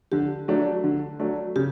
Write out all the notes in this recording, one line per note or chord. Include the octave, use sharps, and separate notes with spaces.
D3 G4
F#3 A3 D4
D3
F#3 A3 D4
C#3 G4